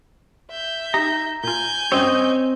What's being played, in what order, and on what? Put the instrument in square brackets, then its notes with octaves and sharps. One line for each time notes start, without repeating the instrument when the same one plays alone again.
[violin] E5 G6
[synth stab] D#4 G4 [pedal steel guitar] A#5
[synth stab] A#2 F4 [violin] G#5 G6
[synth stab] G2 C#4 F#4 [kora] C4 [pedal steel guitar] C#5 D#5